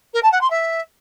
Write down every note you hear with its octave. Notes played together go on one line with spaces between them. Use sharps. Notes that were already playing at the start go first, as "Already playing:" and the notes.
A#4
A5
F#5
C6
E5